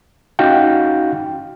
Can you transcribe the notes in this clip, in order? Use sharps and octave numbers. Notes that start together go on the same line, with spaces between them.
C#4 D#4 F#4 F5 G5